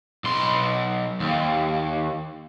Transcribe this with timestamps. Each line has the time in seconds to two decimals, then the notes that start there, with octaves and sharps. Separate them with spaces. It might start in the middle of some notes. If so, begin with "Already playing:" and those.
0.24 B1 C6
1.20 D#2